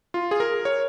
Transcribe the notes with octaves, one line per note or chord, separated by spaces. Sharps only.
F4
G#4
A#4
C#5